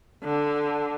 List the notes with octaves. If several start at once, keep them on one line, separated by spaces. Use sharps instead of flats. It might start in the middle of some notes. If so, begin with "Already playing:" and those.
D3